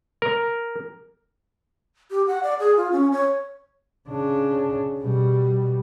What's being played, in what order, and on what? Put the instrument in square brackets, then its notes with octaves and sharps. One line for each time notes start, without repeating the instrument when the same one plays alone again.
[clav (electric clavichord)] A#4
[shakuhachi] G4
F#5
D5
G#4
F4
C#4
C#5
[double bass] C#3 D4
B2 G3